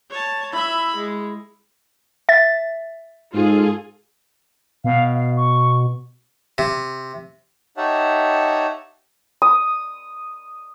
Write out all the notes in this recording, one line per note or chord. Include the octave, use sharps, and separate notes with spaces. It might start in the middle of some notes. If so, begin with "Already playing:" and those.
C#5 A5
E4 E5 B5
G#3
E5 A6
G#2 F4 G#4 A4
B2 F5
F5
C#6
C3
D#4 G4 C#5 E5 F#5 A5
D#6